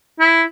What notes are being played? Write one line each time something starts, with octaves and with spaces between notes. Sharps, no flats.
E4